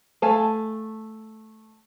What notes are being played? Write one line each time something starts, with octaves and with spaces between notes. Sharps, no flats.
A3 F5 G#5 A5